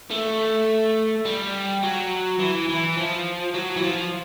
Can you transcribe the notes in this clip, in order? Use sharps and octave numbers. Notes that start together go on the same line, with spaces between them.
A3
G3
F#3
E3
E3
F3
F#3
E3
F3